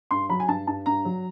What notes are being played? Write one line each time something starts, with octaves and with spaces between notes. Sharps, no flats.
G2 C6
F#3 B5
G#5
G2 A5
G2 A5
G2 A#5
F#3